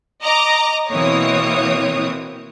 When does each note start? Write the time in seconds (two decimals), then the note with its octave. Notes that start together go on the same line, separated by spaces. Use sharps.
0.23 D#5 A#5 D6
0.89 B2 E3 A#3 C4 C#5 D#6